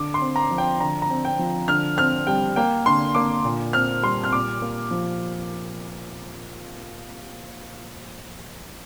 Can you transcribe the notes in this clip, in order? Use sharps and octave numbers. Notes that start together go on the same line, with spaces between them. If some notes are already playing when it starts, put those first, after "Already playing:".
Already playing: D3 D6
C6
C4
A#5
F3
G5
D3 A#5
A#5
C4
G5
F3
D3 F6
C4 F6
G3 G5
A#3 G5
D3 C6
A#3 D6
A#2
C4 F6
G3 C6
F6
A#2 D6
A#3
F3